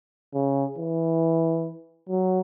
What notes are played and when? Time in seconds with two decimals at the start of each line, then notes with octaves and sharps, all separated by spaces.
0.34 C#3
0.78 E3
2.09 F#3